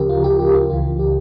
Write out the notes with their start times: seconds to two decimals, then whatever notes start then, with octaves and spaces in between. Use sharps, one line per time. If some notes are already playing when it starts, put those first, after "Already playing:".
Already playing: D2 C#3 F3 C#4 G4 A#4
0.09 F4
0.24 G4
0.39 G4
0.54 F4
0.70 C#2 C#3 E3 F4
0.99 G4